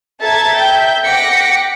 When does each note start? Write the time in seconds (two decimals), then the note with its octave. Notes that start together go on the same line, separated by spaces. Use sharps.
0.21 A4 E5 A5 A#5 G#6 A6
0.54 E5 G5 G6
1.05 F#5 G5 D6 A#6 B6 C#7